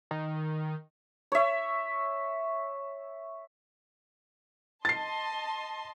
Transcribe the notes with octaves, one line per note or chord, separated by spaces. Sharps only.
D#3
C#5 E5
D#5 A5 C6 A6 C7